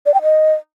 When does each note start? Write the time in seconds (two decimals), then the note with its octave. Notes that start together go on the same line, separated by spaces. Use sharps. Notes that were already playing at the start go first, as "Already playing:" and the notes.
0.06 D5
0.14 G5
0.22 D#5